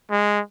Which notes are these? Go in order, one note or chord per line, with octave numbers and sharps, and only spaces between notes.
G#3